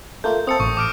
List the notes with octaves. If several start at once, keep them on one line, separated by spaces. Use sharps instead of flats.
A3 A#3 F4 G6
C4 A4 D#6 C#7
A1 C#6
D6 F6 D7